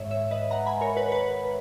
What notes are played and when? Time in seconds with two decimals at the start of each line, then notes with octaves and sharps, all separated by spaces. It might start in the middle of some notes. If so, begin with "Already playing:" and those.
Already playing: G#2 D#3 G#3 C#5 E5
0.11 C#5 E5
0.31 B4 D#5
0.51 F#5 A#5
0.66 G#5 B5
0.81 A#4 C#5
0.97 B4
1.08 C#5
1.12 B4